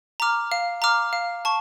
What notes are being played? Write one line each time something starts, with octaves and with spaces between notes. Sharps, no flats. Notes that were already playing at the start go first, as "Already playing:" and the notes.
A#5 D6 F6
F5
A#5 D6 F6
F5
A5 C#6